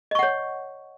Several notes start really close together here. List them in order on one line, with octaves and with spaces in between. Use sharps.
D#5 C#6 F#5 C#5